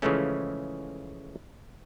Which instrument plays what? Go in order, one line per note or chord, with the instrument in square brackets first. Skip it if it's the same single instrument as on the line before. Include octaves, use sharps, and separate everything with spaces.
[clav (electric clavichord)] C#3 E3 F3 G#3 A3 C#4